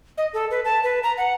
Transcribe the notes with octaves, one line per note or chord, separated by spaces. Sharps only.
D#5
A4
B4
A5
B4
A#5
F#5